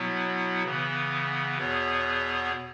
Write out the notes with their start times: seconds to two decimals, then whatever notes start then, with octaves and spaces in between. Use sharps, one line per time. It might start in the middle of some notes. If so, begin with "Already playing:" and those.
Already playing: B2 F#3 B3 E4
0.63 C#3 E3 B3
1.58 E2 B2 B3 G#4 C#5